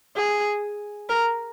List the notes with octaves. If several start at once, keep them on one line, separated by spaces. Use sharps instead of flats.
G#4
A#4